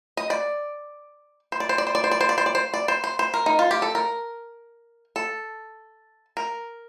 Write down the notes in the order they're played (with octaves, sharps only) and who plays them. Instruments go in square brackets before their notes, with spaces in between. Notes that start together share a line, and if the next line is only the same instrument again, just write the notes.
[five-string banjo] D#5
D5
C5
D5
C5
D5
C5
D5
C5
D5
C5
D5
C5
D5
C5
D5
C5
C5
C5
A#4
D#4
F4
G4
A4
A#4
A4
A#4